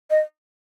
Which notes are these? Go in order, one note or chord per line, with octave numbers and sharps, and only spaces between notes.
D#5